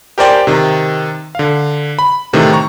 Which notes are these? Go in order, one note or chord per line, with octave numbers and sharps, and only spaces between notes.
G4 A#4 C5 D5 G5 G#5
C3 D#3
D3 F5
B5
A2 C3 D#3 E3 A3
A#5 C#6